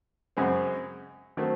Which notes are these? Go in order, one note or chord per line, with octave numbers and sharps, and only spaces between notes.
F#2 C#3 G#3 C4
D#3 F#3 A3 C4